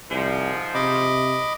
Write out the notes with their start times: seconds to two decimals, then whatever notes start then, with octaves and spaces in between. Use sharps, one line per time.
0.11 C2 G#2 F3
0.74 C3 D#5 B5 D6